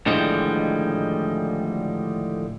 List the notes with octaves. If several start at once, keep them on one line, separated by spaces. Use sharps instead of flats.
A2 D3 D#3 F3 G3 G#3